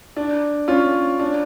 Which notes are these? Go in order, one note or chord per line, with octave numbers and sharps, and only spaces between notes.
D4
C#4 F4
D4